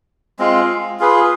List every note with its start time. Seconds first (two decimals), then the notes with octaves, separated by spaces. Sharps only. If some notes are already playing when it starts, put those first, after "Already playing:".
0.39 G#3 C4 F4
0.99 F4 G#4 B4